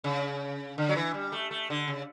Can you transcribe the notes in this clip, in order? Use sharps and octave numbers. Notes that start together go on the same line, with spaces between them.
C#3
D3
F#3
E3
G3
A3
A3
D3
C#3